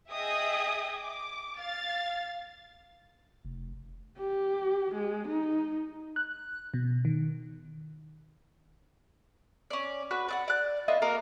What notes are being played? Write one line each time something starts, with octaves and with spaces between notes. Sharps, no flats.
G#4 D#5 E5 G5 D#6
D6
F5 A6
F1
G4
G#3
D#4
F#6
B2
D#3
C#4 D5
F#4 B4 F#6
D5 D#5 F#5
D5 F#6
A#3 E4 F4 D#5
A#3 F#4 A#4 D#5